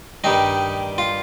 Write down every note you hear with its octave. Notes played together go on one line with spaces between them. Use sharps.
G2 D#3 G3 D#4
F4